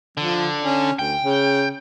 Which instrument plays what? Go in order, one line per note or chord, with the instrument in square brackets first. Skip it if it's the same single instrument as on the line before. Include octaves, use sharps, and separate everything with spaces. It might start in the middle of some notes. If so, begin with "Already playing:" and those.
[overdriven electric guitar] D3 [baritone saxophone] F3
[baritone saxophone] C#4
[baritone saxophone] D2 [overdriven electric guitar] G5
[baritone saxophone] C#3